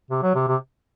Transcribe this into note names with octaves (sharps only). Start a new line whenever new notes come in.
C3
F#3
C3
C3